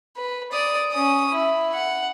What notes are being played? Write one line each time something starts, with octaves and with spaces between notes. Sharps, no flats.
B4
D5 D#6
C#4 D#6
E4
F#5